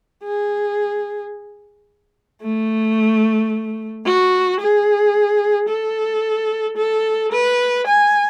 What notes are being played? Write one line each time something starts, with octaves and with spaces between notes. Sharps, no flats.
G#4
A3
F#4
G#4
A4
A4
B4
G#5